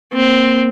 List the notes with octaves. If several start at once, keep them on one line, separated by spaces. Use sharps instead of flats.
A#3 C4